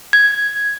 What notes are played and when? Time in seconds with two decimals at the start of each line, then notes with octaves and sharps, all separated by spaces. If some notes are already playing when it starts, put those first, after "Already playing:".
0.13 G#6